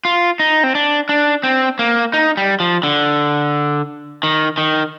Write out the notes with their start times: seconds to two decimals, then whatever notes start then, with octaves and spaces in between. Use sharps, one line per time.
0.05 F4
0.40 D#4
0.63 C4
0.75 D4
1.09 D4
1.44 C4
1.79 A#3
2.14 D#4
2.37 G3
2.60 F3
2.83 D3
4.23 D#3
4.58 D#3